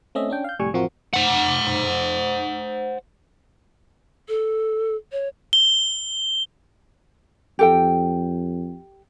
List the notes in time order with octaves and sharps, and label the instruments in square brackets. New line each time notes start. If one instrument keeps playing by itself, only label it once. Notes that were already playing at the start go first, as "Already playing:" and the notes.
[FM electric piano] A3 C4 C#4 D#5 E5
C#4 D4 G5
F5 G6
C2 F2 A2 G3 G#5 C#6
A1 F2 F3 C4 F#4 A#4
[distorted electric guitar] C5 F#5
[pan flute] A4
C#5
[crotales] G7
[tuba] F2 [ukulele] G4 A4 G5